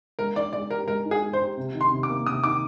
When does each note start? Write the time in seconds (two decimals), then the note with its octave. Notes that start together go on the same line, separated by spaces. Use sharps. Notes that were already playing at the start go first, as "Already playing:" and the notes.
0.19 G#3 A#4
0.36 D#4 D5
0.53 G#3 D5
0.70 G4 A#4
0.87 G#3 A#4
1.05 D#4
1.11 G#4
1.22 G#3
1.33 C5
1.40 G4
1.57 C3
1.75 D#3
1.81 C6
1.92 C3
2.03 D6
2.10 A#3
2.27 C3 D#6
2.44 D#3 D6